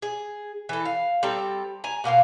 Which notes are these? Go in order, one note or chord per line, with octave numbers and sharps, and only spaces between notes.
G#4
E3 A4
F5
G3 C4 A4 A#5
G#5 A#5
B2 A#3 F4 F5